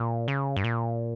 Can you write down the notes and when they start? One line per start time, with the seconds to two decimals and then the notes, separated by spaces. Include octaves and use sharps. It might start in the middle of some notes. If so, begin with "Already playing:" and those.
Already playing: A#2
0.28 C#3
0.56 G2
0.64 A#2